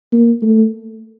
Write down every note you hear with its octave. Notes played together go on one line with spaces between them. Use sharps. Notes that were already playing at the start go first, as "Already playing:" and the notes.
A#3
A3